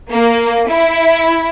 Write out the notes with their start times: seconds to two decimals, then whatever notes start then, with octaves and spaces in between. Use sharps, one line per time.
0.12 A#3
0.69 E4